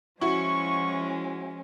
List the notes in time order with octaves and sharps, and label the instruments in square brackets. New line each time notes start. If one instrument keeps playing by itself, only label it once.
[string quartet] F3 G#3 C#4 [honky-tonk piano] E4 F#4 [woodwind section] C#6